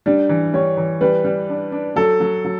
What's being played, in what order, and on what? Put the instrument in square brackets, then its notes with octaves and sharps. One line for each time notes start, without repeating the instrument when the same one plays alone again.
[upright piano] G3 [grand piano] D4
[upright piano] E3
[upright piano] G3 [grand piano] C#5
[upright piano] E3
[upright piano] G3 [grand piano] B4
[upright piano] G3
D4
D4
[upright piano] F#3 [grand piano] A4
[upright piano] F#3
F#3